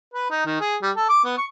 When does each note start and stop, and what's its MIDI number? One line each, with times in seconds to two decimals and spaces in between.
0.14 0.27 71
0.30 0.45 63
0.45 0.58 51
0.60 0.76 68
0.82 0.91 55
0.96 1.08 69
1.09 1.22 86
1.24 1.37 59
1.38 1.45 85